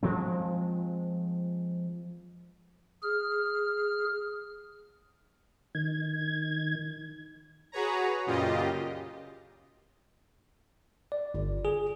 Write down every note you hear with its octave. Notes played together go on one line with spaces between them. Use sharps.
F3 G#3 C4
G#4 F6
D#3 G#6
F#4 G#4 B4 C#5 A#5
F#2 A#2 C#3 F4 G4 D#5
D5
G1
G#4